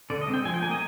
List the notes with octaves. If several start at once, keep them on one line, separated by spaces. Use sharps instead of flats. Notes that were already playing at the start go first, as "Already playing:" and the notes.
D3 D5
D#5
G#3 C4
G5
F3 G#5
G5
A#3 G#5
D#5